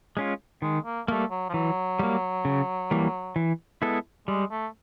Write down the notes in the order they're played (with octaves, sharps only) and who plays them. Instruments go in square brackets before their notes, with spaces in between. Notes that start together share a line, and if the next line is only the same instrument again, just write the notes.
[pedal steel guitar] G#3 C#4 F4
[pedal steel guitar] D#3 [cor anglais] G#3
[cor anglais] A#3
[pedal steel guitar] G3 A#3 [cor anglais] A3
[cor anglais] F#3
F3
[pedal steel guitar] E3 [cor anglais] F#3
[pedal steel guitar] G3 A#3
C#3
E3 G3 A#3
E3
G#3 B3 E4 A4
[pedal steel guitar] G3 [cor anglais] G#3
[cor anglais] A3